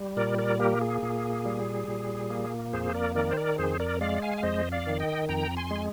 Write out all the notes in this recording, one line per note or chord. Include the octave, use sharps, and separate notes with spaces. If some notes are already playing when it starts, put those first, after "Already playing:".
Already playing: G3
A#2 A#4 D5
A#4 D5
A#3 G4 A#4
G#4
A#2
G3
A#2
A#3
F2 G#4 C5
A#4 D5
D#3 A#4 D5
C5
A#4 D5
F2 G#4 C5
A#4 D5
G#3 D5 F5
F5 G#5
F5
F2 C5 D#5
D5 F5
D#3
D#5 G5
F2 G5 A#5
G#5 C6
G#3 G#5